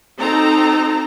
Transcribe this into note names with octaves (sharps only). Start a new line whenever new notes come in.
C4 D#4 F#4 A4 A#5